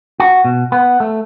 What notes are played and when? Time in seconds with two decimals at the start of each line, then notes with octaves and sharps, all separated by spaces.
0.20 F#4
0.45 B2
0.72 B3
1.00 A3